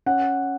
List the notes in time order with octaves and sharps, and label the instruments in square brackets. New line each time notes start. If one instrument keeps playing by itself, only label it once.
[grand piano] C#4 F#5